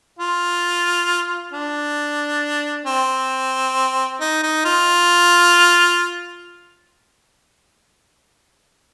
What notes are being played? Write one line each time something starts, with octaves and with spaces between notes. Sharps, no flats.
F4
D4
C4
D#4
D#4
F4